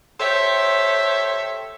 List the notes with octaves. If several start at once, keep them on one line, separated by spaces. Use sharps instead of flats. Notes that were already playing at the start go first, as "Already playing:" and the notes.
G4 A4 C5 C#5 E5